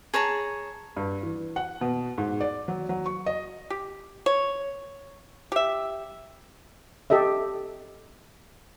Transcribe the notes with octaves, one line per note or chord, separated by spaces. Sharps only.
G#4 C#5 A5 A#5
G2
E3
F#5
B2
G#2
D5
F#3
F#3
C#6
D#5
G4
C#5
G4 E5
G4 A4 D#5 E5